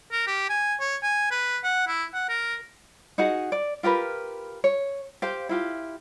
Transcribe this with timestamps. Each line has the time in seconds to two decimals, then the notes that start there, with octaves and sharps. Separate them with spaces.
0.12 A#4
0.27 G4
0.50 G#5
0.80 C#5
1.03 G#5
1.31 B4
1.64 F#5
1.88 E4
2.14 F#5
2.29 A#4
3.18 D#4 F#4 G#4 F#5
3.52 D5
3.83 F4 G4 A#4 B4
4.64 C#5
5.22 G4 C5 F5
5.49 E4 F4 G4